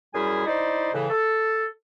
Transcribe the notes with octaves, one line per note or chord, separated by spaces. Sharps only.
F#2 G3 E4 G#4 G#5
D#4 E4 C5 D5 D#5
A2 C#3 E3
A4